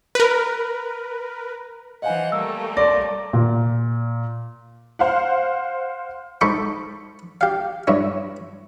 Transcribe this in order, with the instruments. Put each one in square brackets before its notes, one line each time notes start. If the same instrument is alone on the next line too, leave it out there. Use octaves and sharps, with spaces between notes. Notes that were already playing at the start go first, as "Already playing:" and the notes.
[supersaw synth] A#4 B4
[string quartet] E3 C5 F#5 [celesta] D#5 F5 G#5
[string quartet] G3 A3 A#3 [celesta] E6
[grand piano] D5 [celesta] C6 A#6
[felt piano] A#2
[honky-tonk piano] C5 F5 F#5
[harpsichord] G#2 A4 C5 B5 C#6 D6
G4 F5
G2 E4 C#5